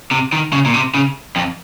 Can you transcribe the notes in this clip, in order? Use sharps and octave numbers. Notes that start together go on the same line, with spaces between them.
C3
D#3
C#3
A#2
C3
C#3
F2